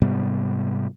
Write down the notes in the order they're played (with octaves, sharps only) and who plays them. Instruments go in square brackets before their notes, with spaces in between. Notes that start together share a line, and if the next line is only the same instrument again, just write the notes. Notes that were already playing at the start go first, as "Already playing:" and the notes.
[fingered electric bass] G#2 C3 G3 B3